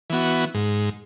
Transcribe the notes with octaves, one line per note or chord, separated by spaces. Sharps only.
E3 B3 F#4
G#2